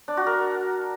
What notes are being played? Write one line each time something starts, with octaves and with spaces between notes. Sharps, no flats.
D4
F#4
A#4